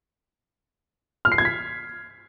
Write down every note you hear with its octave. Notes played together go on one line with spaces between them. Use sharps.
F6
C7
G#6
B6